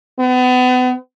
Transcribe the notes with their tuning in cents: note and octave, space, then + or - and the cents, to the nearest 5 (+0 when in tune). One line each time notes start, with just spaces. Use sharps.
B3 +35